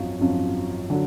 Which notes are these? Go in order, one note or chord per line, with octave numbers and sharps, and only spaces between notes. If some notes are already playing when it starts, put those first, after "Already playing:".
Already playing: G#1 F#2 F3 F4 F#4
G#1 F#2 F3
D3 F#3